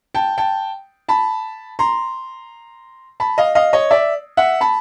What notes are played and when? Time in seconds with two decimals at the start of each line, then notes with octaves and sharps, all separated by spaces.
0.14 G5 A5
0.38 G5 A5
1.09 A5 B5
1.79 A#5 C6
3.20 A5 B5
3.38 D#5 F5
3.55 D#5 F5
3.73 C#5 D#5
3.91 D5 E5
4.37 E5 F#5
4.61 A5 B5